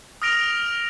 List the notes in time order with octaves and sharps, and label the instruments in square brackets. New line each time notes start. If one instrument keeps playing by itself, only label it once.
[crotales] D#6 F6 A#6 D7 F7